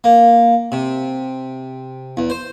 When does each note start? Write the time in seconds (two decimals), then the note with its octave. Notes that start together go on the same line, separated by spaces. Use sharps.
0.04 A#3
0.72 C3
2.17 E2
2.30 C5